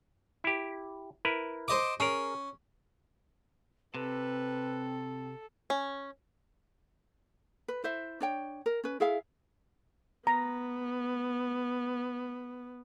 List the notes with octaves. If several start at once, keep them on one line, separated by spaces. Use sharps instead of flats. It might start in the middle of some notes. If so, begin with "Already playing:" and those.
E4 G4
E4 A#4 B4
C5 D#5 D6
C#4 G#4 A#4
C3 C4 A4 B4
C#4
B4
E4 C5 E5
D4 C#5 G5
A#4
C#4 B4
E4 G#4 E5 F5
B3 A#5